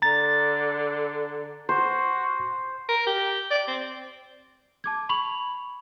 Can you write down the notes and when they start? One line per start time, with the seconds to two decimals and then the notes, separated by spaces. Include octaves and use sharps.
0.02 D3 A#5 A6
1.69 F#4 C5
2.89 A#4
3.07 G4
3.51 D5
3.68 C4
4.84 A5 D6 G#6
5.09 B5 C#6 F7 F#7